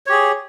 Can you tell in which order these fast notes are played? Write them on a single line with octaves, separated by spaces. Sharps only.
C#5 G4 G#4